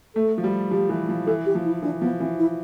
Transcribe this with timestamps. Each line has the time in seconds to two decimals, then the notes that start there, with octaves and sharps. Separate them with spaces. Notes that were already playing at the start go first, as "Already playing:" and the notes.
0.15 A3 A4
0.38 F3
0.44 G3
0.71 F3 G4
0.89 E3
1.09 F3
1.26 E3 A4
1.46 G4
1.55 F3
1.65 E4
1.82 E3 D4
2.01 F3 B3
2.20 E3 C4
2.39 E4